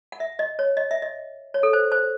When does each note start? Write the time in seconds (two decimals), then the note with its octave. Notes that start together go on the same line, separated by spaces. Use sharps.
0.12 F#5
0.20 E5
0.39 D#5
0.59 C#5
0.77 D#5
0.91 E5
1.02 D#5
1.54 C#5
1.63 A4
1.73 C5
1.92 C5